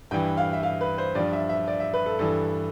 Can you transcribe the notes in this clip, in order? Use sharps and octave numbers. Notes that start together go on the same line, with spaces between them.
G2 E3 G5
F5
E5
F5
B4
C5
G2 F3 D5
E5
E5
D5
E5
B4
A4
G2 E3 A4